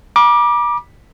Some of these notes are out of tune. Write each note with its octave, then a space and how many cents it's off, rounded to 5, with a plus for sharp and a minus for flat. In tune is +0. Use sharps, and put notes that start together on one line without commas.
B5 -45 D6 +10